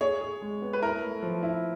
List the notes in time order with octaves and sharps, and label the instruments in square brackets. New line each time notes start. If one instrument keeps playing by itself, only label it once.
[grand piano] G#4 [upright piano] C#5
[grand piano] G#4
G#3
B3
[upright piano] B4
[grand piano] E4 [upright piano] A#4
[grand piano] A3
F3
E4